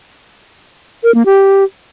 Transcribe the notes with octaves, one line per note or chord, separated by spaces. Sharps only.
A#4
A#3
G4